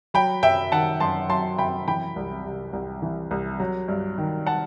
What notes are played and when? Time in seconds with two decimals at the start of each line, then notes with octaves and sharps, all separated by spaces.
0.14 F#3 G5 B5
0.43 F#2 E5 G5
0.72 D#3 F#5 A5
1.00 F#2 A5 C6
1.29 F#3 A5 C6
1.58 F#2 G5 B5
1.88 E3 G5 B5
2.16 C2
2.45 C3
2.73 C2
3.02 E3
3.31 C2
3.60 F#3
3.88 G2
4.18 D#3
4.47 F#5 A5